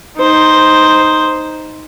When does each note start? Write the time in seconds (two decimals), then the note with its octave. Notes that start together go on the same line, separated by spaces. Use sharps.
0.18 D#4 C5